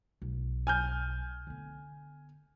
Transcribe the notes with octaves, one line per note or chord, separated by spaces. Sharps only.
B1
G#5 F6 G6
D3 B3